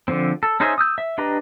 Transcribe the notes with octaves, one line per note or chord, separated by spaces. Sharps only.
D3 F3 C4
A4
C#4 D#4 G#4 C5 E5
D#6 E6 G6
E5
D4 G4 B4 D#5 A#5